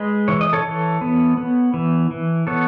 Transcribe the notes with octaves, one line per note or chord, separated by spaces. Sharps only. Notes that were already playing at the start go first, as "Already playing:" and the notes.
Already playing: G#3 B4 D#5
E3 C#5
D#5
A4 C#5
E3
B3
B3
E3
E3
B3 A4 C#5